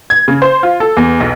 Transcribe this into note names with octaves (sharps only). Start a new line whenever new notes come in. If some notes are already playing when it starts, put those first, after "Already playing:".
G#6
C#3
C5
F4
A4
E2
B1